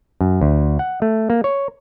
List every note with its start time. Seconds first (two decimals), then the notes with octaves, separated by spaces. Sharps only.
0.21 F#2
0.41 D2
0.79 F#5
1.02 A3
1.30 A#3
1.44 C#5